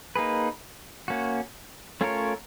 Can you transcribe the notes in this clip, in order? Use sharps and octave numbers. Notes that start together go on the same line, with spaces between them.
A#3 D#4 G#4 B4
A#3 C#4 F#4
A3 C#4 F4 A#4 C#5